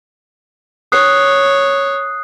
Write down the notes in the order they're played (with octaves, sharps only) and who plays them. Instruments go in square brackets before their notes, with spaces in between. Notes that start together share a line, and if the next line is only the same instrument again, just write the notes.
[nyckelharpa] C#5 [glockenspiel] D#6 F#6 C7